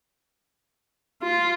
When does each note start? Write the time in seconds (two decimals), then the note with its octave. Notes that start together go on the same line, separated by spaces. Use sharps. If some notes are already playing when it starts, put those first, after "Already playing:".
1.23 F4